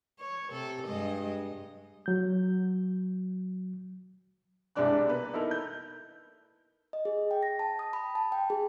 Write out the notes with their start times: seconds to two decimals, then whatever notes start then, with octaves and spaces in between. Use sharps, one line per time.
0.19 C#5
0.51 C3 A4
0.87 G2 G#3 D#5
2.06 F#3 G6
4.75 C2 G2 G#3 D4 D5 F#6
5.07 A#3 B3 B4
5.34 D#4 E4 A4 A#4
5.51 G6
6.93 D#5
7.05 G#4
7.31 G5
7.43 A#6
7.59 A5
7.79 D#6
7.93 B5
8.15 A5
8.32 G5
8.50 G#4